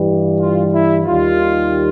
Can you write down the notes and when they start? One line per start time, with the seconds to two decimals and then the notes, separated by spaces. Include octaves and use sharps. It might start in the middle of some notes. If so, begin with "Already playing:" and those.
Already playing: G2 E3 G3
0.39 F4
0.72 E4
1.05 D#2 D#3 G3 F4